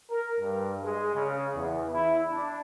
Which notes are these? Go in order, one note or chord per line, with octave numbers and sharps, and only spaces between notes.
A#4
G2
G#3
C#3
E2
E4
D4